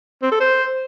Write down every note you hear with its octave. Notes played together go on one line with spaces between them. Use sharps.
C4
A4
C5